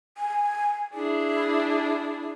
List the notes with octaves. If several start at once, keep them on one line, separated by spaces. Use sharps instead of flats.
G#5
D4 E4 G#4